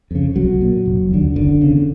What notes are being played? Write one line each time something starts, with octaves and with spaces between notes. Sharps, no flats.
F2 C#3
B1 F#3
A#2
F1
D#2 D3
F#1 D3
E2 C#3